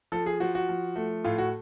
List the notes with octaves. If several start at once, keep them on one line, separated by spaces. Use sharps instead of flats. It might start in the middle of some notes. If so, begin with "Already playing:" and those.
F3 A4
G#4
F3 F#4
F#4
F3
A3
A2 F4
F#4